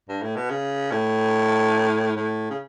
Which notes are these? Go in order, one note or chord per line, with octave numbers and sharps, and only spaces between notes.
G2
A2
B2
C#3
A2
A2
C#3